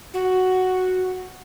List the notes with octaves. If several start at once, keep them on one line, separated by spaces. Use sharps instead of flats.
F#4